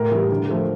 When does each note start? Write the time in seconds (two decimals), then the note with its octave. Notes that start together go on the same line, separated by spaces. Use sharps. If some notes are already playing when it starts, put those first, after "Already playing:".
Already playing: A2 A#4
0.12 E3 G3
0.30 D3
0.48 F3 A3